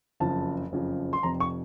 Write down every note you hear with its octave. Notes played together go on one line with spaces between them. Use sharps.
F#1 F2 C#3 F3 A5
F#1 F2 C#3 F3
C6
F1 F2 C3 A#5
C#6